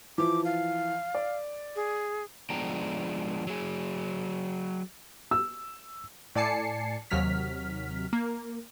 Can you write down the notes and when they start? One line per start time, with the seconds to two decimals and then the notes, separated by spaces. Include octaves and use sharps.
0.18 E3 F3 D6
0.45 F5
1.15 D5
1.76 G#4
2.50 F3 G#3 B3 D4 G5 A#5
3.47 F#3 G#4
5.31 E6
6.35 A2 D5 G#5 A5 C7 C#7
7.10 D#2 C3 F#3 F6 B6
8.13 A#3